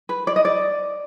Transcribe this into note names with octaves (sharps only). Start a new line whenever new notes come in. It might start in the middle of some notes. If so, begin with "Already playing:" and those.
B4
D5
D#5
D5